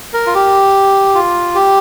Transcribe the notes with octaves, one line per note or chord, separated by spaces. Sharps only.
A#4
F4
G4
F4
G4